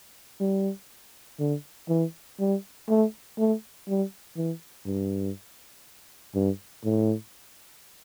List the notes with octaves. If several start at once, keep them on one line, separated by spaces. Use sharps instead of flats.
G3
D3
E3
G3
A3
A3
G3
E3
G2
G2
A2